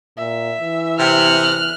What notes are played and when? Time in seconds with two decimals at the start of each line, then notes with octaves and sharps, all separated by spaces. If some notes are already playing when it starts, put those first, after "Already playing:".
0.18 A#2 E5
0.60 E3
0.99 C3 F6 F#6